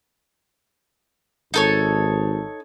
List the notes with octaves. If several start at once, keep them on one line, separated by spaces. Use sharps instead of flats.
G#1 D#4 A4 C#5